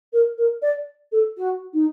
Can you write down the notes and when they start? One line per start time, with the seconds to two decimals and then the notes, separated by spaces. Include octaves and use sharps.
0.12 A#4
0.37 A#4
0.62 D5
1.12 A4
1.37 F#4
1.73 D#4